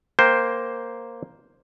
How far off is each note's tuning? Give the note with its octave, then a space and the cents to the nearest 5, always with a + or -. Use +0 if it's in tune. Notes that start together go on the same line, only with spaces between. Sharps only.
A#3 +0 C5 +0 G5 +0